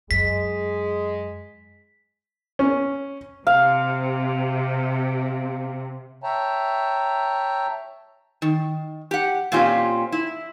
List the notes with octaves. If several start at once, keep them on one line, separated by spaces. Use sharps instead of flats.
F#2 G#3 B6
C#4
C3 F5
C#5 E5 G5 A5 A#5
D#3
G4 F#5
A#2 C4 C#4 F4 G4
E4